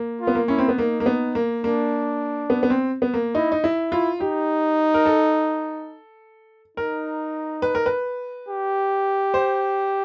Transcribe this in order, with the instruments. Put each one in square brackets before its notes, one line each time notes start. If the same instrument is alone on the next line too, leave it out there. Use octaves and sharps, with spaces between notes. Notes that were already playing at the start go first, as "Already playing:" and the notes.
Already playing: [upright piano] A#3
[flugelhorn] F4
[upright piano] B3
A#3
[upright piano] C#4 [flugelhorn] E4
[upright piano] C4
B3
[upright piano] A#3 [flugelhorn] D#4
[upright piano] A#3
B3
A#3
[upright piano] A#3 [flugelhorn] D4
[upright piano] B3
B3
C4
B3
A#3
[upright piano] D#4 [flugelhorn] E4
[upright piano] D#4
E4
[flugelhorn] E4 [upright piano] F4
[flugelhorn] D#4 [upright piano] G4
[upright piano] A#4
A4
[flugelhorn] D#4 [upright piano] A#4
[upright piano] B4
A#4
B4
[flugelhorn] G4
[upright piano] C5